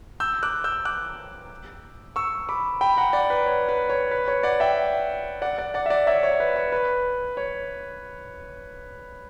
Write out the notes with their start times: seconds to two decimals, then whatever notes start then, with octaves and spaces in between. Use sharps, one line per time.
0.20 E6 G6
0.43 D6 F#6
0.64 E6 G6
0.85 D6 F#6
2.16 C#6 E6
2.49 B5 D6
2.81 G5 B5
2.97 F#5 A#5
3.13 D5 F#5
3.30 B4
3.46 C#5
3.69 B4
3.89 C#5
4.11 B4
4.28 C#5
4.43 D5 F#5
4.60 E5 G5
5.42 D5 F#5
5.58 D5 F#5
5.74 D5 F#5
5.86 E5
5.90 D5 F#5
6.06 C#5 E5
6.23 C#5
6.40 B4
6.56 C#5
6.72 B4
7.37 C#5